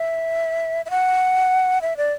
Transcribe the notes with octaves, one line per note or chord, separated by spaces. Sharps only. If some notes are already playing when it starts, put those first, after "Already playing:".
Already playing: E5
E5
F#5
E5
D5